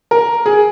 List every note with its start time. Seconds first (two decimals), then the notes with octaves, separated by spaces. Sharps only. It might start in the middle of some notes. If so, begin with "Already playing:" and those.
0.11 A#4
0.46 G#4